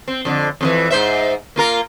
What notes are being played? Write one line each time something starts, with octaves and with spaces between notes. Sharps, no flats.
C4
F2 D3
F2 D3 E3
G#2 C5 E5
A#3 F4 A#4